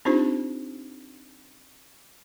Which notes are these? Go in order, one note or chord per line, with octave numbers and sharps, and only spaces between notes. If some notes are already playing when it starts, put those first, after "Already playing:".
C4 D4 D#4 F4 G4 C5